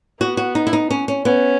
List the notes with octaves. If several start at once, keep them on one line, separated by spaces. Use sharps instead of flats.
B3 F#4
F#4
D#4
E4
D#4
C#4
C#4
B3 C#4